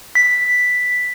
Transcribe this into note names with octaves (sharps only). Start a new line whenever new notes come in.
B6